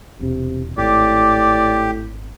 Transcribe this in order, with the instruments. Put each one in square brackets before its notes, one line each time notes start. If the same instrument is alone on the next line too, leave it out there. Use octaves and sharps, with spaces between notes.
[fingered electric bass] E1 [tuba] C3
[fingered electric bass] G#1 [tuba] A2 [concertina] G4 [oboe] D5